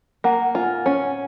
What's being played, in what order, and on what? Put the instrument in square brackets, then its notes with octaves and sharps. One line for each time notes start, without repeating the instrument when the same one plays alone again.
[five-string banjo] A#3 [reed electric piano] F#5
[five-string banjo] F4 [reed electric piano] G#5
[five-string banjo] C#4 [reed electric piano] G#5